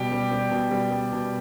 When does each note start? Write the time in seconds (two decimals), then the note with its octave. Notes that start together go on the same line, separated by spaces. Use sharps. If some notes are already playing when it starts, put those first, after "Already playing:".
Already playing: B2 G3 G4
0.12 G3
0.32 G3
0.51 B2
0.71 G3
0.91 G3
1.13 B2